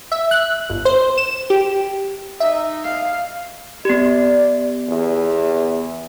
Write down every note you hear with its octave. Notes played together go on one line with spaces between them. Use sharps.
E5
F#6
G1
C5
E7
G4
D#4 E5
F5
B3 G4 D5
E2